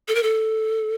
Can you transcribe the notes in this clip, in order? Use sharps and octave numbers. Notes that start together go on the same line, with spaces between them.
A4
A#4
A4